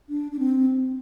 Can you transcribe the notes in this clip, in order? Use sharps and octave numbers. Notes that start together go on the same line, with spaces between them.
D4
D4
C4